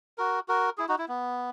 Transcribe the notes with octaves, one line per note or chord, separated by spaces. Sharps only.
F#4 A#4
F#4 A#4
E4 G#4
D#4 F#4
E4
B3